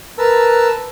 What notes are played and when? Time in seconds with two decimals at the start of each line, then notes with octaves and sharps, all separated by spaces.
0.18 A#4 B4 A5 E6